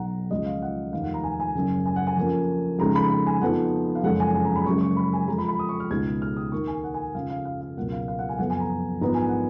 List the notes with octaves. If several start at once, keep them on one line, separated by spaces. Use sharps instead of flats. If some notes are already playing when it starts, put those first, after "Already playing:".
Already playing: B1 B2 F#3 F#5 A#5
C#2 C#3 F3 G#3 D#5
F5
F#5
F1 D#2 D#3 F5
F#5
A#5
G#5
G#5
F#1 F#2 C#3
G#5
F#5
G#5
F2 F3 A#3 C#4
F2 C#3 G#3 D#4 A#5
B5
B5
G#5
F2 F3 B3 D#4 F#5
F5
F#1 F2 C#3 G#3 C#4 F#5
G#5
G#5
A#5
B5
F#1 F#2 C#3 G#3 C#6
C#6
B5
G#5
F2 F3 G#3 A#5
B5
B5
D#6
C#6
F6
C#2 B2 G#3 D#4 G#6
F6
D#6
D#2 D#3 A#3 D#4 C#6
G#5
F#5
G#5
F2 C#3 F3 F5
F5
F5
F5
C#2 B2 F#3 A#3 F#5
F5
F5
F#5
G#5
F#1 F2 F3 B3 F#5
G#5
A#5
A#1 G#2 D#3 F#3 B3 A#5
G#5
F#5